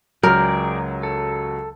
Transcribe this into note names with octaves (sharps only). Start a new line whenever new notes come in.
C#2 F#3 G#4 A#4 D5 G5
A4